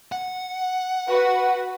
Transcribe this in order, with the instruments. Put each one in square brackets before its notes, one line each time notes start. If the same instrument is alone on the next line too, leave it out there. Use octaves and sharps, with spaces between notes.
[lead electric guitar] F#5
[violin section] F#4 B4